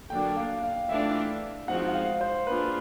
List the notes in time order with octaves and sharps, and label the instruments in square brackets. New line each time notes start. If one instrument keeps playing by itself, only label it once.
[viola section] D3 F#3 A#3 D4 [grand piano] G5
[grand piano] F5
F5
[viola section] E3 A3 D4 F4 [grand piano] E5
[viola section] F3 G#3 C4 D#4 F#4 [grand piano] F#5
[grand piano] F#5
F5
C5
[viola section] A#3 D4 F4 G#4 [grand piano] B4